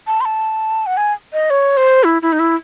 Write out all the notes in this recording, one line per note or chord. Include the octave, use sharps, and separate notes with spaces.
A5
C6
A5
F#5
G#5
D#5
C#5
C5
E4
E4
D#4
E4